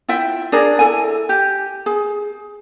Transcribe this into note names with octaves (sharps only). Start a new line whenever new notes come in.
E4 F4 E5 G5
D4 G#4 A#4 D5
E4 A4 G#5
G4
G#4